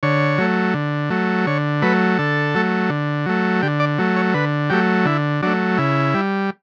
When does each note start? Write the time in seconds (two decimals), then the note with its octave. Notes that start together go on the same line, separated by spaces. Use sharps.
0.03 D3 C#5
0.38 F#3 A3
0.74 D3
1.10 F#3 A3
1.47 D3 C#5
1.82 F#3 A3 B4
2.19 D3 A4
2.54 F#3 A3
2.90 D3
3.26 F#3 A3
3.62 D3 G4
3.80 D5
3.98 F#3 A3
4.16 C#5
4.34 D3 B4
4.70 F#3 A3 G4
5.05 D3 E4
5.42 F#3 A3 D4
5.78 C#3 E4
6.14 G3